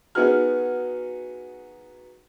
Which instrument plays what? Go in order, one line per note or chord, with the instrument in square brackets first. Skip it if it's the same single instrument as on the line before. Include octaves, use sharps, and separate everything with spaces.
[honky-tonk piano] B3 D#4 F#4 G#4 F6